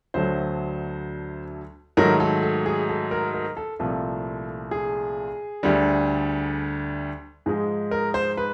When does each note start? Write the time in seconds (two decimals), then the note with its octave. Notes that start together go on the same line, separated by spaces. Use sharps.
0.14 D2 D3 F#3 A3 C5
1.97 G#2 D#3 F#3 A3 A#4
2.20 A4
2.42 A4
2.66 G#4
2.89 A4
3.11 A#4
3.34 A#4
3.57 A4
3.79 C2 A#2 F3 A3 A4
4.71 G#4
5.63 D2 D3 G3
7.46 G#2 F3 G#3 G#4
7.91 A#4
8.14 C5
8.37 B4